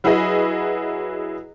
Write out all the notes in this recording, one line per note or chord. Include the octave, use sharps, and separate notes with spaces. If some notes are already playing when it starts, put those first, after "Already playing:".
F#3 E4 F#4 G#4 B4 D#5